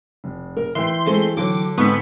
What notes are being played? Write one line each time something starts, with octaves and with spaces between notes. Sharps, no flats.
F1
A#4
E3 E5 G5 C6
G#3 A3 C4 G#4
D3 F#3 D6
G#2 B3 C4 C#6 E6 B6